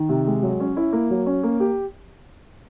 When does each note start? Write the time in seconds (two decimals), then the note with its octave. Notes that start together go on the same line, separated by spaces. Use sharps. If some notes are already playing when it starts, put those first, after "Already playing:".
Already playing: D#3
0.09 C3
0.27 G#3
0.42 F#3
0.60 C#4
0.77 E4
0.93 A#3
1.10 F#3
1.26 C#4
1.43 A#3
1.60 G4